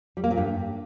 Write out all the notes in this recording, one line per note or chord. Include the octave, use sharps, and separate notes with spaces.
G3
A#3
A#2
G2